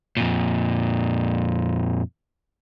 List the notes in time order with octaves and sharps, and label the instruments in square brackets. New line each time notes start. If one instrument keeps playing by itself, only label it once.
[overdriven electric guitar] F2 A#2